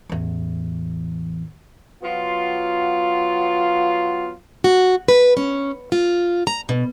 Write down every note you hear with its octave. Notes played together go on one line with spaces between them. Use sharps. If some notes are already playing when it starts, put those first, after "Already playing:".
A1 E2
F#3 B3 F4
F#4
B4
C#4
F4
A#5
B2